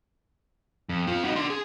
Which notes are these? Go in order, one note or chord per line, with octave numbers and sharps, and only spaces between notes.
F2
C4 F4
D#4 F#4
D4 C6
G#4